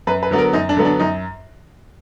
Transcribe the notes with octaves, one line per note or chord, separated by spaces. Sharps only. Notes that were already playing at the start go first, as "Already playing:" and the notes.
F#2 B4
B4
D3 F#3 B3
A#4
F#2 D#4
D4
D3 F#3 B3
D4
F#2 D#4